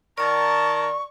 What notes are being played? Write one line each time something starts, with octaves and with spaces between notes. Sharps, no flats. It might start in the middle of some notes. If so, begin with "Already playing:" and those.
D#3 A#4 D5 A5 C#6